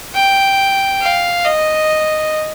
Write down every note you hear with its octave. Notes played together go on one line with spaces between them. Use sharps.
G5
F5
D#5